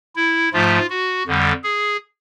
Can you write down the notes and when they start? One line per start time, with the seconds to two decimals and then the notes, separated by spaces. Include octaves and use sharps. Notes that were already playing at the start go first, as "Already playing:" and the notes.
0.16 E4
0.53 G#2 F3 A3 F4
0.90 F#4
1.27 F2 D3 G3
1.64 G#4